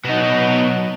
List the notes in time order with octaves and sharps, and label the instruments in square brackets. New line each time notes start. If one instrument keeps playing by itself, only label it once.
[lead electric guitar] B2 [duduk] F#3 [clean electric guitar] B3 D#4 [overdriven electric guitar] F#4 D#5